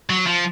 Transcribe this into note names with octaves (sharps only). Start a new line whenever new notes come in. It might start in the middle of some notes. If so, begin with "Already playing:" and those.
F#3
F3